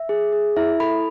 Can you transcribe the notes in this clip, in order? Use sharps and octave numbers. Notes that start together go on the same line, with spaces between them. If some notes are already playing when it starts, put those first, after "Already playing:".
Already playing: E5
G#4
G#4
E4 E5
A4 B5